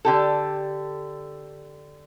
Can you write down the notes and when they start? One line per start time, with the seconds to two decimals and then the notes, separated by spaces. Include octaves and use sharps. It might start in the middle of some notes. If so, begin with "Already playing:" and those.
0.05 D3 G4 A4